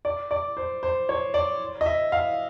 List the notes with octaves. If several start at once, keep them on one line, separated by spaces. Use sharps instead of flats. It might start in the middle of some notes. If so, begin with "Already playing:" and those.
D5
D5
C5
C5
C#5
D5
D#5
E5
F5